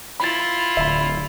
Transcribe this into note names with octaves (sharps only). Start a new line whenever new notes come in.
E4 F4 B5 A6
D1 D3 E5 B5